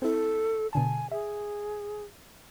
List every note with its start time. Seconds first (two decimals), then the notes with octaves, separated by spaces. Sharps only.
0.02 C4 E4 A4
0.73 B2 D3 G#5 A5
1.11 G#4 E5